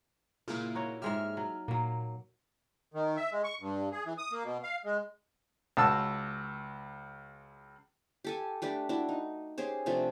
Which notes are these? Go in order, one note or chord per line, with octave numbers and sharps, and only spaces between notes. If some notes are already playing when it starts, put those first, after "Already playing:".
A#2 C#3 A#3 E4 F4
D#4 F#4 C#5
G#2 G#3 G4 E5 F6
F#3
A#2 F#3 A#3
D#3
E5
G#3
C#6
G2
G#4
E3
D#6
A#3
B2
F5
G#3
C#2 F#4 A5 E6
G4 A4 G#5
A3 D4 G4 B4
D4 E4 F#4
D#4
C#4 G4 G#4 C5
C3 F3 A3 D4